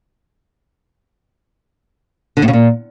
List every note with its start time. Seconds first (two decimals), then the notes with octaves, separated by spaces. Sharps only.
2.37 D3
2.42 A2
2.48 C#3
2.53 A#2